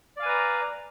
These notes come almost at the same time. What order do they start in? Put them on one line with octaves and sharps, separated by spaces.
D5 F5 G#5 B4 A#5